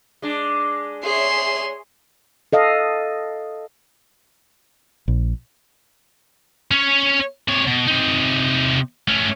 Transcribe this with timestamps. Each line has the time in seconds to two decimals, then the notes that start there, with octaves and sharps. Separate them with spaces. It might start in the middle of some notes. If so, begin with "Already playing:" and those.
0.22 G#3 D4
1.04 G#4 C#5 E5 C6
2.53 A4 D#5 F5
5.08 A#1
6.71 C#4 C#5
7.48 C3 C#5
7.67 B2
7.87 C3 D#4
9.08 A3 C#4